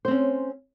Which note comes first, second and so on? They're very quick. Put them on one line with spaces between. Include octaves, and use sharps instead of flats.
C5 C4 C#4